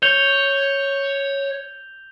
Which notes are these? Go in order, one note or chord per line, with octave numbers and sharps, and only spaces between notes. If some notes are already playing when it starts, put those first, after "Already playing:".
C#5 G6 F7 G7